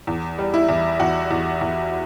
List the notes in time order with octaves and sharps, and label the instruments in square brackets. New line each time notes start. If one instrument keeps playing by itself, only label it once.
[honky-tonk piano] E2
G3
E4
E2
E2 F#4
E2
E2